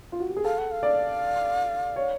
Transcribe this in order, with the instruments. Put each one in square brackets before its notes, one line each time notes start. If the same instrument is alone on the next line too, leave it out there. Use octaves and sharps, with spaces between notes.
[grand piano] F4
F#4
G4
G#4
[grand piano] A4 [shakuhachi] F5
[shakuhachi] F#5
F5
[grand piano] D5
C#5